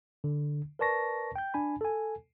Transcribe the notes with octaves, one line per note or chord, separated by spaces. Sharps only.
D3
A#4 B4 D5 A5 C#6 A#6
G5 G6
D4 G#5 B5
A4 G#5